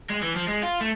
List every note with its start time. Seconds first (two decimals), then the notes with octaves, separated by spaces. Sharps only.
0.09 G#3
0.22 E3
0.35 F3
0.47 G#3
0.62 F4
0.81 A3